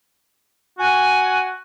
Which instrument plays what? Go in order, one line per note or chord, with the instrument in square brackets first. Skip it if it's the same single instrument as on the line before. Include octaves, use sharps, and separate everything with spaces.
[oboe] F#4 [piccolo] G#5